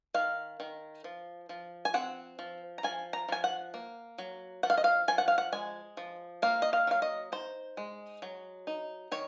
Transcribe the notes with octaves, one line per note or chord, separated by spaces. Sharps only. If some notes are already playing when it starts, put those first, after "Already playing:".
D#3 F5
D#3
F3
F3
G#5
C4 F#5
F3
A#5
F3 G#5
A#5
F3 G#5
F#5
A#3
F#3
F3 F#5
F5
D#5
F5
F3 G#5
F#5
F5
F#5
G#3 G#5
F3
A#3 F5
D#5
F5
F#3 F5
D#5
D#4 C5
G#3
F#3
D#4
D#3 C#5